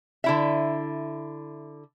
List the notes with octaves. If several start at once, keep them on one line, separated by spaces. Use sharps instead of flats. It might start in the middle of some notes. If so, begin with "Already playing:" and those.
D3 E4 E5